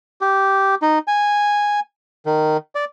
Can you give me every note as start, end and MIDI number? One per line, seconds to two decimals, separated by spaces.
0.21 0.75 67
0.82 0.99 63
1.08 1.80 80
2.26 2.57 51
2.75 2.85 74